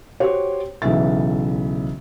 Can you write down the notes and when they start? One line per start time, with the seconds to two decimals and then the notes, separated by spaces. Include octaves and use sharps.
0.20 F#4 G4 C5 C#5
0.82 B1 C#3 E3 E5 A6